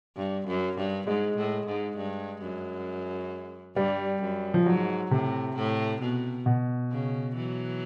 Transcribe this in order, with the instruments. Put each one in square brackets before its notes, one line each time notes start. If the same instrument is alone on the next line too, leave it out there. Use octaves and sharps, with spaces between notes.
[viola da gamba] G2
F#2
G2
[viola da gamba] G#2 [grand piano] G#3
[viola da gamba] A2
G#2
G2
F#2
[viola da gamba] G2 [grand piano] G3
[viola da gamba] F#2
[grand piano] F3
[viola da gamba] G#2 [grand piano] F#3
[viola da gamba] A2 [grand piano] C3
[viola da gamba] A2
B2
[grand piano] B2
[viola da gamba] C#3
E3 F#3